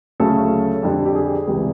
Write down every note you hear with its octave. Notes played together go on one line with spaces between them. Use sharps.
D2 C#3 F#3 A3 C#4 A4
F2 D3 G3
G4
G#4
C#2 C3 E3 G3